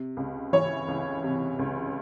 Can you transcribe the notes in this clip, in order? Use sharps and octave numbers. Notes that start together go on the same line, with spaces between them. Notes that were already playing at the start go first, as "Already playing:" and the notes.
Already playing: C3
C#2
E3 C#5
C#2
C3
C#2